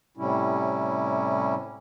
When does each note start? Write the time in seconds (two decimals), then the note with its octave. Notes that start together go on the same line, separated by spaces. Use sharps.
0.17 A2 C3 G3 C#4 E4